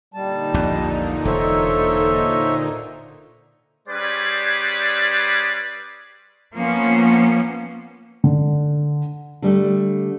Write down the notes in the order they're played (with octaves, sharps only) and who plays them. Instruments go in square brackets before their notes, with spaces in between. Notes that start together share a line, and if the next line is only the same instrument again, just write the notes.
[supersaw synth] A#2 D3 D#4 [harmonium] G3 A5
[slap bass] A#1 E2
[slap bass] E1 [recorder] A4 [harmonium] C5 C#5 E5
[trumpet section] G3 C#4 G#4 B4 C5 D5
[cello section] F3 A#3 B3 C#4
[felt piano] D3
[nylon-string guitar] D3 G3 A3